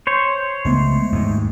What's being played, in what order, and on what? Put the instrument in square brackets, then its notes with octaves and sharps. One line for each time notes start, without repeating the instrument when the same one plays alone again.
[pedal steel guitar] C5 C#5
[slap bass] C#2 B3 [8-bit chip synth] G#3 A3
[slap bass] D#2 G#2